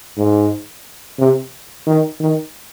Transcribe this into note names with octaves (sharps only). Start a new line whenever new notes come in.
G#2
C3
D#3
D#3